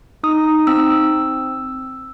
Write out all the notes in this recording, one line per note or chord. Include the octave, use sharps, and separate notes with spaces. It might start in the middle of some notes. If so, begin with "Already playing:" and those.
D#4 D#6
C4 E6